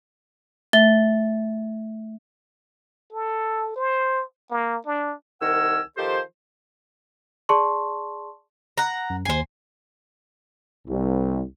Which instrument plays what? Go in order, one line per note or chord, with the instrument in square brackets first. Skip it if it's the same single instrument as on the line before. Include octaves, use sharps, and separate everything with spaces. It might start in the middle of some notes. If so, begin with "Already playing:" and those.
[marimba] A3 [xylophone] E5 A6 G7
[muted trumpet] A4
C5
A#3
D4
[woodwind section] C2 D#3 A#4 F#5 G#5 E6
D#3 F3 G4 A4 C5
[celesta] G#4 D5 A5 C6 C#6
[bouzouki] F#5 A#5
[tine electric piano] F#2
[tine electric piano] D#2 C7 [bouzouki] C5 G#5
[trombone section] C2